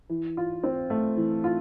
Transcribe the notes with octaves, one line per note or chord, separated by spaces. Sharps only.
E3
F4
C4
A3
E3
F4